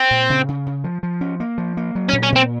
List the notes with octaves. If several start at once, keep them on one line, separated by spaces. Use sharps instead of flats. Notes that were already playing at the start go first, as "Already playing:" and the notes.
Already playing: C4
A#2
C#3
C#3
C#3
F3
F3
C#4
A#3
F3
A#3
F#3
C#4
A#2
C#4
A#2 C4